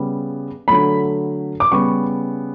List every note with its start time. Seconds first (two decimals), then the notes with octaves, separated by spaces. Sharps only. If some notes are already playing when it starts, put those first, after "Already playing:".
Already playing: C#3 G3 B3
0.68 D3 F#3 A3 B5
1.60 D6
1.72 C#3 G3 B3 C#6